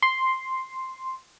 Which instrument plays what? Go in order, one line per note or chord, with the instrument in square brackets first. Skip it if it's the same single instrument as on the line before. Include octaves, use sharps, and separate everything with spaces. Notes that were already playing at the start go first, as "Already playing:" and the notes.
[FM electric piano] C6